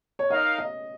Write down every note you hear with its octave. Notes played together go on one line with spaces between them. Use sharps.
C#5
D#4 A#4 D#5 F5
D#5